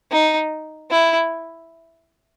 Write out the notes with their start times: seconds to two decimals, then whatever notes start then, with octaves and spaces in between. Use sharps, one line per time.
0.11 D#4
0.91 E4